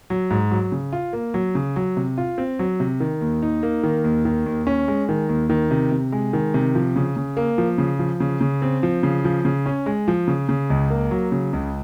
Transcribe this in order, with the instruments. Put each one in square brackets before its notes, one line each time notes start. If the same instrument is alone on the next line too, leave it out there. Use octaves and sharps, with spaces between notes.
[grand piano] F#3
G#2
F#3
C#3
F4
A#3
F#3
C#3
F#3
C3
F4
C4
F#3
C3
D#3
D#2
D#4
A#3
D#3
D#2
D#3
D#2
C#4
G#3
D#3
D#2
D#3
C3
C3
G#3
D#3
C3
F3
C#3
C#3
A#3
F3
C#3
F3
C#3
C#3
C4
F3
C#3
F3
C#3
C#4
G#3
F3
C#3
C#3
C#2
A#3
F#3
C#3
C#2